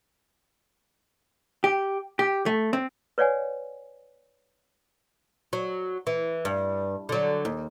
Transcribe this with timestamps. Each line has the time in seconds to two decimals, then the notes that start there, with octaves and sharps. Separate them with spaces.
1.64 G4
2.19 G4
2.46 A3
2.73 C4
3.18 B4 C#5 D5 F#5 G#5
5.53 F#3
6.07 E3
6.45 G2
7.09 D3 F#3
7.45 D#2